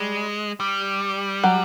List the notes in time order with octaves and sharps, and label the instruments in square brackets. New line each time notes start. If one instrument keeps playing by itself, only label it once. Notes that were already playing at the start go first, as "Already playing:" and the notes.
Already playing: [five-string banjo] G3 [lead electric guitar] G#3
[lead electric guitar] G3
[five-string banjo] F#3